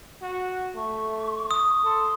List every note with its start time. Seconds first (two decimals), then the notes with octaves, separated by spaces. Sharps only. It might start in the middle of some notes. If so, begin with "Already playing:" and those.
0.22 F#4
0.75 A3 C#6
1.51 D#6
1.85 A4 C6